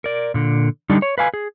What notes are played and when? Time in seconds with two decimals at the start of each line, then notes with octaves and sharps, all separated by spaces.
0.04 A#4 D5
0.34 A#2 D3
0.90 D3 G3 D4 D#4
1.02 C#5
1.18 B4 F5 G#5
1.34 G#4